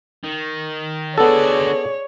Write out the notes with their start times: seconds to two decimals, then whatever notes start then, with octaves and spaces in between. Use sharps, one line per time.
0.24 D#3
1.18 D3 B3 F#4 G#4 A4 C#5 D5